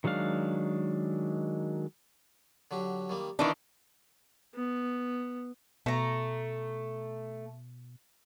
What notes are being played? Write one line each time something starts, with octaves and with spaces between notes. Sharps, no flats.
D#3 F#3 G#3 D4 F5
D3 F#3 G4
D#3 G3 A#3
D#3 E3 D4 F5 D6
B3
B2 A3 A#5